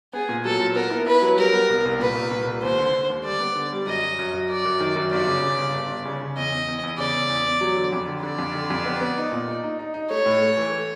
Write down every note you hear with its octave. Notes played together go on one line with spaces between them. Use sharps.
B3 G#4
A#2
F#3 A4
A#2
B3 A#4
E4
E4 B4
F#3
G3 A#4
B3
C2
C2
A#2 B4
C2
A#2
C2
D#2 C5
D3
D3
D#2
G3 D5
B3
D3
G3
F#2 D#5
F#2
F#2
F#2
F#2 D5
F#2
D#3
F#2
G1 D5
C#3
C#3
G1
G1
G1
C#3
C#3
E2 D#5
E2
E2
E2
C#3 D5
E2
E2
E2
F#3
D3
F2
D3
D3 D5
F2
D3
F2
B3
B3
D#4
A#2
D#4
D#4
D#4
D#4
A3 C#5
A2
A3
E3
A3